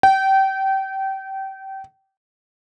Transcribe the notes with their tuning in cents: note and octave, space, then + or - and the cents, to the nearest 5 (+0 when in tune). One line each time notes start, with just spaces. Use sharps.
G5 -25